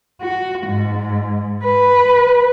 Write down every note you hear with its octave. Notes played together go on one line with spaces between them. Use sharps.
F#4
G#2
B4